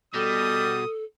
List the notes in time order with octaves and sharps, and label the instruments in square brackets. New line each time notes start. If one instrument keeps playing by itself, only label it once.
[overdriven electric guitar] B2 [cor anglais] G3 [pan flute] A4 [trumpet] D#6